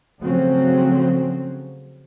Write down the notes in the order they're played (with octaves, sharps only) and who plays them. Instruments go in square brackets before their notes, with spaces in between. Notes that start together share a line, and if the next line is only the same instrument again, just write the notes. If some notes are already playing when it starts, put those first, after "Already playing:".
[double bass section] C#3 F3 F#3 A3 C4 C#4